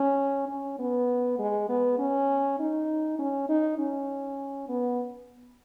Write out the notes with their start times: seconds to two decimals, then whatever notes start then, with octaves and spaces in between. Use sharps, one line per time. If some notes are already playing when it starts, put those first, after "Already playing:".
Already playing: C#4
0.48 C#4
0.79 B3
1.39 G#3
1.69 B3
1.98 C#4
2.59 D#4
3.19 C#4
3.49 D#4
3.78 C#4
4.69 B3